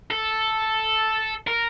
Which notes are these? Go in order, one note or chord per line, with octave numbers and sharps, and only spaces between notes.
A4
A#4